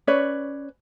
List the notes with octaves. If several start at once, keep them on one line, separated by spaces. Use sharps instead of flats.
C#4 B4 C#5 D5